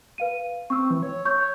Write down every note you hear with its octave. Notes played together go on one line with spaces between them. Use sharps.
B4 F5 D#7
C4 C#6 E6
E3
C#5
C#5 C#6 G6